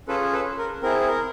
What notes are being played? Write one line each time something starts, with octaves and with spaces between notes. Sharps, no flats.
C#4 F4 G#4 A4 B4
A4 B4
A#4
C4 E4 G#4 A#4
A#4